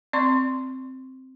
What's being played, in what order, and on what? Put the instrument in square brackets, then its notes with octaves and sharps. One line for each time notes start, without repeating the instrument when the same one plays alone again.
[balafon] C4 D5 C6 C#6